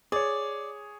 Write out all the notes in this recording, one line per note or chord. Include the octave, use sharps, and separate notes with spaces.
G#4 C#5 D5